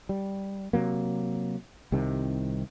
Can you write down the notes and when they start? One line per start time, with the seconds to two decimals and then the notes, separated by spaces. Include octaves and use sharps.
0.09 G3
0.73 C3 F#3 A#3
1.92 C2 C3 D#3